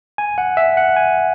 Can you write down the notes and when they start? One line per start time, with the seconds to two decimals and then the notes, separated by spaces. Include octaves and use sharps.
0.18 G#5
0.38 F#5
0.57 E5
0.77 F#5
0.96 G#5